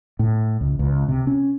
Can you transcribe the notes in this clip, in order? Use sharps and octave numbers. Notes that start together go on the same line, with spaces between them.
A2
C#2
C#2
C3
C#4